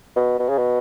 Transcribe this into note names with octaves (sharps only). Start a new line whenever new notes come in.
B2
B2
C#3
B2